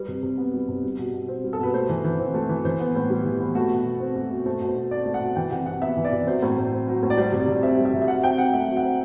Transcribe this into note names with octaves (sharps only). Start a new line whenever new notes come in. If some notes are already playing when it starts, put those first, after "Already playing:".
Already playing: G3 B4
C3
C3
B3
G3
C3
G3
B2
B2
C4
G3
A4
B2 B4
A3 C5
E3
E3
C4
A3
E3
E3 C5
B3
A2
G3
E3
B3
A3 F#4
B2
B2
C4
A3
B2
A3 C5
B2
C5
B2
C4 D5
A3
F#5
B2
E3 G5
C3 F#5
C3 F#5
B3 E5
E3
D5
C3
F#3 C5
A2
A2
C4
F#3
A2
D5
G3 C5
C3
D5
C3
C4 E5
G3
E5
C3
E5
F#3 F#5
C4 G5
C3 F#5
A3 E5
F#3
F#5
C4